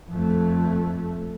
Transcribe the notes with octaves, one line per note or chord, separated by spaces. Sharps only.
F2 A3